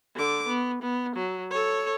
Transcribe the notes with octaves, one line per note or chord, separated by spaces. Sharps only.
D3 D6
B3
B3
F#3
A4 C#5